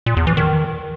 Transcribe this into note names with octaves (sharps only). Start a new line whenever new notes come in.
A#2
E2
E3
D#3